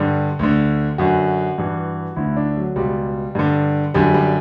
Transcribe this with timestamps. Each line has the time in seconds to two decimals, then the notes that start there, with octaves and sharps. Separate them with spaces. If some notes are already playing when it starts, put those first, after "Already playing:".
Already playing: G2 D3 G4
0.39 D2 D3
0.98 F#2 D3 F#4
1.58 G2 E3
2.16 D2 D3 E4
2.37 D4
2.57 F#3
2.76 C#2 B2 G3
3.35 G2 D3
3.94 F#2 D3 G3
4.14 G3